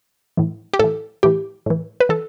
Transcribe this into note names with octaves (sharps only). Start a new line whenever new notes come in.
A2 E3
G4
A2 E3 A4
A2 E3 G4
A2 E3
B4
E3 A4